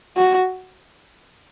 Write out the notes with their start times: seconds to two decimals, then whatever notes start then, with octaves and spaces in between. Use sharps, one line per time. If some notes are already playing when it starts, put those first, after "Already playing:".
0.16 F#4